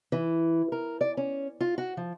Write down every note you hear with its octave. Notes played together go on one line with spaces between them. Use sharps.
E3
A#4
D5
C#4
F4
F#4
F3